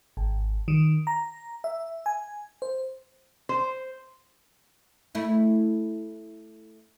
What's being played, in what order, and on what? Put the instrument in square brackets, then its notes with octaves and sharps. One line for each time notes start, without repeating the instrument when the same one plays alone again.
[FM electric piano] G#1
D#3
A#5
E5
G#5
C5
[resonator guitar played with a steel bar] C5
[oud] A3 E4